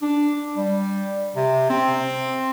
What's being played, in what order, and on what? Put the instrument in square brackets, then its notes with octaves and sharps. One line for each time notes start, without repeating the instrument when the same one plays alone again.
[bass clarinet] D4
G3
C3
C4